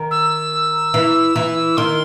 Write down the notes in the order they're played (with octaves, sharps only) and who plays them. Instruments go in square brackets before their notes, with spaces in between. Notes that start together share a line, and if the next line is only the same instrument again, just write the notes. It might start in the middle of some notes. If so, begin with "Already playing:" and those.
Already playing: [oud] D#3
[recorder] E6
[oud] E3
E3
[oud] D#3 [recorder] C6